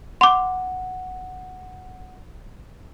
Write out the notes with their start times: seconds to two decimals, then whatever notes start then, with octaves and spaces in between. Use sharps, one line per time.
0.21 F#5 C6 D6